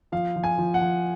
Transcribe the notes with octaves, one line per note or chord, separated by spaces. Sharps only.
F3 F5
F3
G#5
F3
F#5
F3